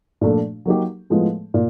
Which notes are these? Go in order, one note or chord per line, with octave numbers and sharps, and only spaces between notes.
A#2 F3 A3 D4
F#3 A#3 D#4 G4
A2 F3 G#3 B3
A#2